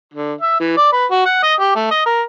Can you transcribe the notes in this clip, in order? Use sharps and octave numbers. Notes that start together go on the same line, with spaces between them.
D3
E5
E3
D5
B4
F#4
F#5
D#5
G4
A3
D#5
A#4